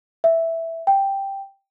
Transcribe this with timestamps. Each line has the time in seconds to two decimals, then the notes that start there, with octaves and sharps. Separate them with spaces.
0.24 E5
0.87 G5